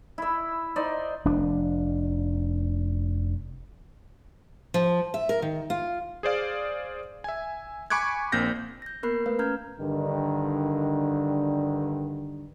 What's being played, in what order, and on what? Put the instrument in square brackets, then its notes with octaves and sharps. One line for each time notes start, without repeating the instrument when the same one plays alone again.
[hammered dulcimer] E4 E5
D#4 C5 D5
[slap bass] F1 D4
[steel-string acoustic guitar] F3
E5
A#4
D#3
F4
[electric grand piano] G#4 C5 D5 F5
E5 G#5
G#5 B5 C#6 D6 F#6 G#6
A#1 A#3 C4 G6 A#6
[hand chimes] G6 A#6
A#3 B3 A#4 B5 F#6 C7
A3 B4 F5
C#4 A#5 F6 G6 G#6
[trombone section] G2 D3 D#3